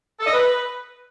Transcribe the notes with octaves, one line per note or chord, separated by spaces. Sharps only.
A4
D#5
B4